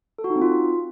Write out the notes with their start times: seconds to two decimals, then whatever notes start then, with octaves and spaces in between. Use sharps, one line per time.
0.18 A4
0.24 F#4
0.30 D#4
0.36 C4
0.42 F4